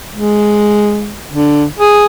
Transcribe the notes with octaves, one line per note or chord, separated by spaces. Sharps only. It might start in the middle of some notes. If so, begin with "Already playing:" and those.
G#3
D3
G#4